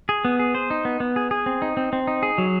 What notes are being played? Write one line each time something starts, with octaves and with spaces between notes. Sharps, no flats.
G#4
B3
G#4
C5
D#4
B3
B3
G#4
G#4
C4
D#4
C4
C4
D#4
G#4
F#3